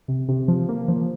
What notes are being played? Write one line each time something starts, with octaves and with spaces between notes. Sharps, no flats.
C3
C3
F3
A#3
F3